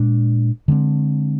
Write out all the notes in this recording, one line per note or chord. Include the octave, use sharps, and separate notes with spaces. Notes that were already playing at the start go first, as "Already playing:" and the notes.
Already playing: A#2 G#3 D4
D3 G#3 C4